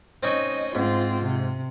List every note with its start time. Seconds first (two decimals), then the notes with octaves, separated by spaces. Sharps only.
0.23 C4 C#4 D#4 D#5
0.75 G#2 C4 F4
1.23 C3